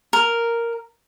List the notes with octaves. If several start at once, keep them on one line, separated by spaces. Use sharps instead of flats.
A#4